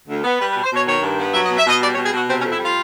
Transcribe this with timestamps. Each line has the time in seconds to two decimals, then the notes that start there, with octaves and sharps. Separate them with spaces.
0.09 D2
0.24 B3
0.40 G3 B4
0.51 B4
0.56 B2
0.63 C5
0.72 B2 C#5
0.87 D#3 C#5
1.02 G2
1.18 B3
1.34 F#3 E5
1.46 D#5
1.50 B2
1.58 E5
1.66 B2 D#5
1.81 G3 D5
1.93 C#5
1.97 B2
2.05 G#4
2.12 B2 F#4
2.28 C3 C4
2.40 C#4
2.44 F2
2.51 E4
2.60 G3 F4